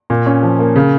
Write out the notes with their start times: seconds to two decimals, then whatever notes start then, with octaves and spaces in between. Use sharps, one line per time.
0.10 A#2
0.26 C#4
0.43 F3
0.59 A#3
0.76 C#3